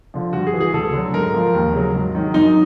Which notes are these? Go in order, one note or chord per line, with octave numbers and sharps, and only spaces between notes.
D3 F3
G2 F#4
G#4
E3
G#4
D2 A4
D3 F#3
G#2 A#4
F3
D#2
C#3 F#3
G#2
D#3 F#3
F#2 D#4